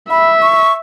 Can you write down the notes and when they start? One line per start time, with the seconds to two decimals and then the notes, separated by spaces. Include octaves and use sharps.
0.10 E5 B5
0.42 C#6